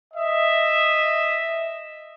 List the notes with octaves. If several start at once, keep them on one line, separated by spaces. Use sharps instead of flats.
D#5 E5